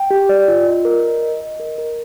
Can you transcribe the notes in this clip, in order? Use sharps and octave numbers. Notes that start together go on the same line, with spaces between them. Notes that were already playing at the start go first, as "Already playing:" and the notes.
Already playing: G5
G4
D5
F4
D#5
A#4
D#5
D#5
D#5
A#4
A#4